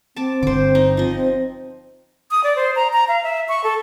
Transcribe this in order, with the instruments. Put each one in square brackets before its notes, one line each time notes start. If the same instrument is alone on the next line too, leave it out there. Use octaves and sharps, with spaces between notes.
[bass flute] C4 [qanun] A5 D6
[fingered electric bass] G1 D3 [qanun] C5 D6
[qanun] D#4
[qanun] F3 D#5 [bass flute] C4
[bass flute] C4
[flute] D#6
D5
C5
A#5
A#5
F5
E5
C#6
A4